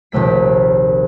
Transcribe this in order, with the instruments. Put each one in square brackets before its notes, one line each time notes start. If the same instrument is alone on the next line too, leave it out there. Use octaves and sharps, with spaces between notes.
[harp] A#1 D#2 C3 A3 B6